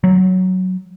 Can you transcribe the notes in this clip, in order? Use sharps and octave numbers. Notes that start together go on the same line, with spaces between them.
F#3